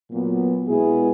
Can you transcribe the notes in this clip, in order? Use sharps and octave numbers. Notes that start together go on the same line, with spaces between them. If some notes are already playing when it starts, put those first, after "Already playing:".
A#2 F#3 B3
B2 G#3 B3 E4 G#4